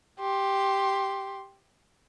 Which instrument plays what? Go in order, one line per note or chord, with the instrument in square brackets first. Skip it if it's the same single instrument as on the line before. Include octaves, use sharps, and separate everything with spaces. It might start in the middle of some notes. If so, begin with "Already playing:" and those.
[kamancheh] G4 C6